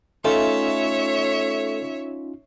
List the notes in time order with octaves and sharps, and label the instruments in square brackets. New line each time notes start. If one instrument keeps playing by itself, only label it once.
[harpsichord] A3 [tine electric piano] C#4 D#4 F4 [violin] C#5 E5